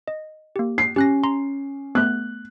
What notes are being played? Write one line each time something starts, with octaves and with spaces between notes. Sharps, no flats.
D#5
A#3 G4
C7
C#4 G4 F#6 A#6
A#5 C6
A3 B3 F#6